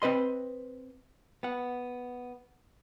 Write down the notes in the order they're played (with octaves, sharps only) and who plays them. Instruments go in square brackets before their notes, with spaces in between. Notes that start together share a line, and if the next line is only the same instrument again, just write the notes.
[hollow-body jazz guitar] C4 B4 D#5 C6
B3 F#5